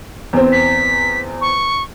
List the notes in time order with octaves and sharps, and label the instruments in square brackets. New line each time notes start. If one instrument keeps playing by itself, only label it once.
[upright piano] E2 C4
[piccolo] B6
C#6